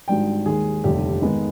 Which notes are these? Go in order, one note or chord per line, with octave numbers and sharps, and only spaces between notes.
G#1 G#2 D#3 G3 D4 G5
D#2 D#3 G#3 G#4
F1 D#2 D3 G3 D4 G4
G#2 D#3 G#3 B3 D#4